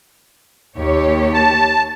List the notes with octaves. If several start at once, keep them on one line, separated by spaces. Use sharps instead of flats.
D#2 G4 C#5
A5